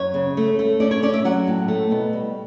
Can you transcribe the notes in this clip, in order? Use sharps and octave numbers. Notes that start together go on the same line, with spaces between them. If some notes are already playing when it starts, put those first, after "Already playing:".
Already playing: F#2 C#5
C#3
A3
A3
C#4 D5
C#5
C#4 D5
E5
F#3 F#5
A2
A3
B2
G3